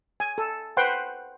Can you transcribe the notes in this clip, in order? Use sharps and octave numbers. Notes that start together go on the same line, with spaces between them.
G#5
A4
B4 C5 F#5 G5 C6